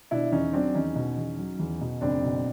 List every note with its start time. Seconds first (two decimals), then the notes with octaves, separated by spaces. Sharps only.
0.11 B2 D4 E4
0.32 E2 C#4 D#4
0.53 F#3 C4 D4
0.74 E2 C#4 D#4
0.96 B2
1.17 E2
1.38 F#3
1.59 E2
1.81 B2
2.01 F#1 C4 D4
2.23 B2